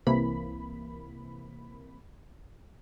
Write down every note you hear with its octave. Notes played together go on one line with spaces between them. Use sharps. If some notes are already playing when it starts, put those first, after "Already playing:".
C2 C3 E3 A#3 B5